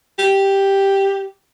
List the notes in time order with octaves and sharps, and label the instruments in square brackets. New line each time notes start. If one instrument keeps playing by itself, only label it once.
[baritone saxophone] G4